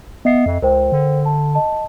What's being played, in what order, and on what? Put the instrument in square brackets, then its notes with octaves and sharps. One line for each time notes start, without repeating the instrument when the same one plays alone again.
[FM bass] B3 [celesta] D#5 E5 C7
[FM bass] F2
[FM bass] C#2 [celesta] A#4 C5 G5
[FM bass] D3
[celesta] A5
D#5 A5